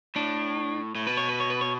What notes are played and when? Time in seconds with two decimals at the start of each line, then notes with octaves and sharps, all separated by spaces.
0.15 A2 D4
0.95 A2
1.07 B2 B4
1.17 C#5
1.29 B4
1.40 C#5
1.50 B4
1.61 C#5